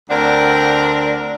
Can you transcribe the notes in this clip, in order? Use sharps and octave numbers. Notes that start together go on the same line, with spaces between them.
D2 C4 D4 A#4 D5 F#5